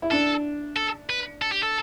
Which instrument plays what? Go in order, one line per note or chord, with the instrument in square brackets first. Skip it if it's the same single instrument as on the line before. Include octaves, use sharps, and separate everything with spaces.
[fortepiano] E4
[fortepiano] D4 [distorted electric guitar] A4
[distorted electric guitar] A4
B4
A4
G4
A4